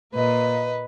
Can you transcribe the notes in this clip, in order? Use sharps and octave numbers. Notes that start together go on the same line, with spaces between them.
A#2 A#3 B4 D#5